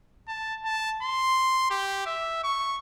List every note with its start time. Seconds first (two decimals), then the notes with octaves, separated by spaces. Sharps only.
0.28 A5
0.65 A5
1.03 C6
1.70 G4
2.06 E5
2.44 C#6